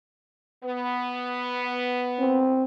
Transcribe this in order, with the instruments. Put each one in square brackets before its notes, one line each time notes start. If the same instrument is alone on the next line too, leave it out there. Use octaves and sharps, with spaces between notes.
[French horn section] B3
[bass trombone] C4